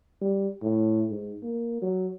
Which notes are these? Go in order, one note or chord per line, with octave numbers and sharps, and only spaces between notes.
G3
A2
G#2
A#3
F#3